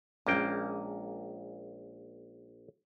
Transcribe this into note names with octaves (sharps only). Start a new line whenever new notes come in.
A#1 G#3 A#3 C#4 G5